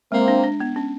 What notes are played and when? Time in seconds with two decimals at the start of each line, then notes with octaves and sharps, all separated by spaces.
0.12 G#3 A#3 C4
0.28 D4
0.44 D4
0.60 B3
0.76 C#4